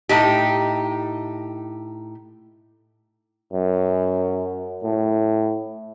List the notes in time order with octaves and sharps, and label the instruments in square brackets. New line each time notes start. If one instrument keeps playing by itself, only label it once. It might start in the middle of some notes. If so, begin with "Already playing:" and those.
[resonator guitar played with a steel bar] A2 D#4 G4
[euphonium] F#2
A2